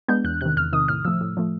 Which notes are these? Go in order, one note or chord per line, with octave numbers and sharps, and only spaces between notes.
G#3 B3 D4 G6
E2 F#6
C3 D#3 F#6
E2 F6
C3 D#3 D#6
A2 F6
F3 A3 E6
A2
F3 A3